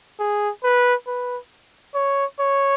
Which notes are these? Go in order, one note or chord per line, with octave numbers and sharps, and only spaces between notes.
G#4
B4
B4
C#5
C#5